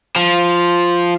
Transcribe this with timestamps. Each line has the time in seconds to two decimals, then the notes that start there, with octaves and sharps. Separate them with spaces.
0.16 F3